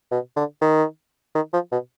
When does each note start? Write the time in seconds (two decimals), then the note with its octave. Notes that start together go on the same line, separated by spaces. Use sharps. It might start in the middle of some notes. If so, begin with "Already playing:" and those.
0.11 B2
0.36 D3
0.61 D#3
1.35 D#3
1.53 F3
1.72 B2